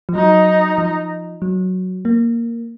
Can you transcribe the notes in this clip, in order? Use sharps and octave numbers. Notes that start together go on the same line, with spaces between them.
F3
F#3 D#4
F3
F#3
A#3